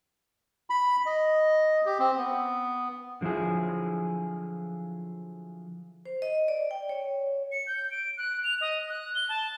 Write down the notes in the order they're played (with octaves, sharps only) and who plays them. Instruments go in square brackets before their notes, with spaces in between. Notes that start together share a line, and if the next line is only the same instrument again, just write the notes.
[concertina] B5
D#5
G4
C4
B3
[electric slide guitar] D3 F3 F#3 E4 G#4
[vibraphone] C5
D#5
D5
G5
C#5
[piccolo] C#7
G6
D7
F#6
F7
D#5
F#6
G7
A5